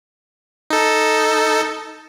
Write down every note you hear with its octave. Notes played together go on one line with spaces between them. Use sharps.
D#4 A4